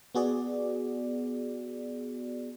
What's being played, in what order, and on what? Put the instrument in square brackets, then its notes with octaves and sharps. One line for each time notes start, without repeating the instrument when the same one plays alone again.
[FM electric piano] B3 F#4 G#4 D5